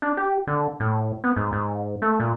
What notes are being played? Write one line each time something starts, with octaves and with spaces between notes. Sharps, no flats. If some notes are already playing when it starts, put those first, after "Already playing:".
D4
G4
D3
A2
B3
G#2
G#2
A3
A#2